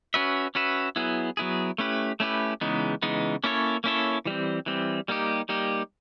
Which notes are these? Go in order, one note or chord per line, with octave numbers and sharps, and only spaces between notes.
C#4 F#4 B4 E5
C#4 F#4 B4 E5
F#3 B3 E4 G#4
F#3 B3 E4 G#4
A3 C#4 E4 G4 B4
A3 C#4 E4 G4 B4
C#3 E3 G#3 B3 D#4
C#3 E3 G#3 B3 D#4
A#3 C#4 E4 A4 C#5
A#3 C#4 E4 A4 C#5
E3 G3 C4
E3 G3 C4
G3 A#3 D#4 G4
G3 A#3 D#4 G4